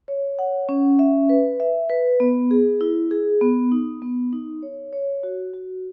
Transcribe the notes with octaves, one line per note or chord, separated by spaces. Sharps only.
C#5
F#5
C#4
E5
B4
E5
B4
B3
G#4
E4
G#4
B3
D#4
B3
D#4
C#5
C#5
F#4
F#4